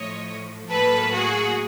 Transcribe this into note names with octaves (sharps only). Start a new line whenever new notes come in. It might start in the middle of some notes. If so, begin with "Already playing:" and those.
Already playing: A2 F3 A3 C#5 D#5
A2 F#3 A#3 A4 B4
F#4 G#4